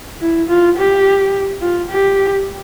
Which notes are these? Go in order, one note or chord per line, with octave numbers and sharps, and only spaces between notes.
E4
F4
G4
F4
G4